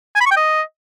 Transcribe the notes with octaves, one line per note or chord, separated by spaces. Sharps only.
G#5
B5
C#6
G5
D#5